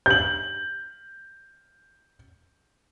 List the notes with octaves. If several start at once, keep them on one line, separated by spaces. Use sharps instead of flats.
G6 F#7